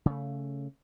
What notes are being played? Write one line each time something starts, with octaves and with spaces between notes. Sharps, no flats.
C#3 A3